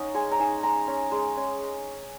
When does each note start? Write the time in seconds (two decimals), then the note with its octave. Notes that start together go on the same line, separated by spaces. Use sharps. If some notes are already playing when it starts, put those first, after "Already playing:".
Already playing: C#4 D#4 D#5 F#5
0.14 G#3 G#5
0.32 A#5
0.39 D#4 G#5
0.63 G#3 A#5
0.88 C#4
1.12 G#3
1.37 C#4